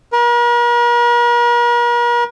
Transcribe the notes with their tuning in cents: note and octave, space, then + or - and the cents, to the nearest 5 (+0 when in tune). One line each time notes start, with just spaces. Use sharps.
A#4 +45